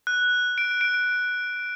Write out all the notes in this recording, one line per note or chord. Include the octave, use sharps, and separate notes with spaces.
F#6
D7
D7